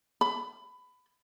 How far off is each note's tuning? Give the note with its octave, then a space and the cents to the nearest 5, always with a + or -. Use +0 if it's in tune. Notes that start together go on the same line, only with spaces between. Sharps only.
B5 +20